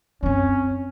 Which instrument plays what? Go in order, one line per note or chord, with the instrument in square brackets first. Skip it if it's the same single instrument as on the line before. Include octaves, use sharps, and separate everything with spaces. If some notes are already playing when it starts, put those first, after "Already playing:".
[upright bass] F#2 C4 [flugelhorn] C#4